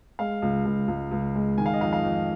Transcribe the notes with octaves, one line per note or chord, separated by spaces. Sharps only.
G#3 F5
C#2
C#2
C#2
C#2
G#3
D#3 G#5
F5
D#5
F2 F5
F5
F2